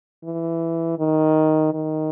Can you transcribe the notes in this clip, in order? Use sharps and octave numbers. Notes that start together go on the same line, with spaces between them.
E3
D#3
D#3